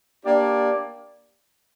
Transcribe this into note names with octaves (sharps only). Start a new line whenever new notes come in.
A#3 D4 G4 D5